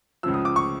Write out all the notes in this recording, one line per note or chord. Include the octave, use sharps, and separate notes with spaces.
C#2 C#3 F3 E6
D#6
D6
C#6